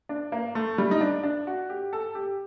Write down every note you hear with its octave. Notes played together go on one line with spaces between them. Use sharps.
D4
A#3
A3
G3
D#4
D4
D4
F#4
G4
A4
G4